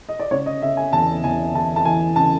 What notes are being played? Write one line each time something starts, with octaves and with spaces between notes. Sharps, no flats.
D#5
D5
C#3 C#5
D#5
C#3 E5
G#5
E2 A5
E2 G#5
E2 A5
A5
E3 G#5
C#3 A5